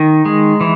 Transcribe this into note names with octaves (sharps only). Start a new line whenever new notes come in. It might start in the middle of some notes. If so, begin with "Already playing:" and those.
Already playing: D#3
G#3
E3